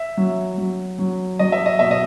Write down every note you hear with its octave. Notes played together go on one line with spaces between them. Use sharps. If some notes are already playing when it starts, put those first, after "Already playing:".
Already playing: E5
F#3
F#3
F#3
F#3 D#5
E5
D#5
B2 E5
D#5